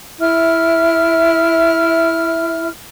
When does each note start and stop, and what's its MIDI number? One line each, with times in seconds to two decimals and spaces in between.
0.21 2.69 64
0.21 2.69 76
0.21 2.69 89